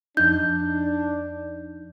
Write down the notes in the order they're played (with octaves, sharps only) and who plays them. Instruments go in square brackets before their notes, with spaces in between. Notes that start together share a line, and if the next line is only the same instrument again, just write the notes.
[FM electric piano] F2 D#4 [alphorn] D4 [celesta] G6